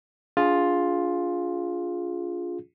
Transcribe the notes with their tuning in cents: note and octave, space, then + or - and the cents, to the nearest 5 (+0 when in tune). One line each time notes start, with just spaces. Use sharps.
D4 -35 F4 +10 G#4 +0